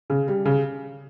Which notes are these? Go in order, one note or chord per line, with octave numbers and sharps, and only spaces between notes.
C#3
G3
C#3